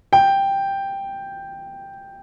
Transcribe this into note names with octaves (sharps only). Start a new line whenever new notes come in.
G5